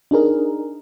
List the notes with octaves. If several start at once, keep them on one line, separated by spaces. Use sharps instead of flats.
D4 D#4 G#4 A#4